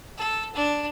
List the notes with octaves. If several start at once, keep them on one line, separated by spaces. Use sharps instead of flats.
A4
D4